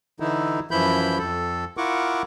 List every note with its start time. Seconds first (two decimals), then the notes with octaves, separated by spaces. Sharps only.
0.20 D3 E3 D#4 E4
0.71 F#2 E3 F3 E4 B5 G6
1.19 F2 A4
1.77 E4 F4 A#4 F#5 C#6 D6